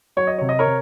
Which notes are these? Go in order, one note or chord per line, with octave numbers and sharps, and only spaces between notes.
F#3 C#5
D#5
C3 C#5
D#5
A#4 C#5
C3